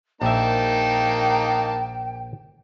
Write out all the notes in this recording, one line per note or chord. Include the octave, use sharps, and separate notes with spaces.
A#1 A#3 D#4 E5 G5 A5